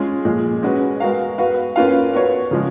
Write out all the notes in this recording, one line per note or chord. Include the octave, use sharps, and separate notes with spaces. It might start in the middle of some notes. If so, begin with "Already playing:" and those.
Already playing: G#3 C#4 F4 G#4
A#2 F3 G#3
G#3 C#4 F#4 B4
G#3 B3 F#4 A#4 F5
B3 F#4 B4 F5
A#3 C#4 F4 B4 F5
B3 F#4 C#5
C#3 F3 G#3